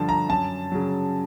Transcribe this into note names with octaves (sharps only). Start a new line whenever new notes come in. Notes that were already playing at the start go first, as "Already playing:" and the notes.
Already playing: G2 D3 F3 A5
A#5
F#2 A5
C#3 F#3